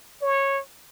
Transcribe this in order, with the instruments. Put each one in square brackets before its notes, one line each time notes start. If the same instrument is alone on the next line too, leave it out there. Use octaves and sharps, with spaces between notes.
[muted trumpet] C#5